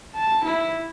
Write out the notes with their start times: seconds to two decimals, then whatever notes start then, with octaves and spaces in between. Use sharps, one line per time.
0.15 A5
0.45 E4